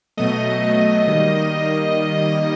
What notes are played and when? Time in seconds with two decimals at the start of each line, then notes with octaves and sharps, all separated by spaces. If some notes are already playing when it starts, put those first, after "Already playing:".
0.17 B2 F#3 A3 D#5
0.62 B2 F#3 A3
1.07 D#3 G3 A#3